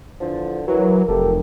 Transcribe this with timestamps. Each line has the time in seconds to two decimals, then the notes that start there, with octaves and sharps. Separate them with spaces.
0.20 E2 D3 F3
0.68 E3 F#3 A#4
1.09 F1 G4 A4